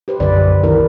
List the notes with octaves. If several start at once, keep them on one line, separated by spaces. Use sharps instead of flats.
G4 B4 C5
B1 F#2 D3 B4 D5
C2 D#3 E4 A#4 B4